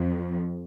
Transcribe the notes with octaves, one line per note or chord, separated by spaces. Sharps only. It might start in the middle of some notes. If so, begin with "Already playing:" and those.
Already playing: F2